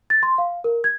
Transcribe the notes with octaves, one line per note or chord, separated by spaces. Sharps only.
A6
C6
F5
A#4
G#6